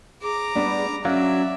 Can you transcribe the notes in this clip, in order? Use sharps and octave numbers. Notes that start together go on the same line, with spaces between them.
G#4 A#5 D6
G3 B3 D4
F#3 C#4 D5 E5 F5